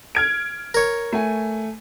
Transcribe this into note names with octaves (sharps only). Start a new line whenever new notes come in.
F6 G#6 D7
A#4 C#5
A3 G#5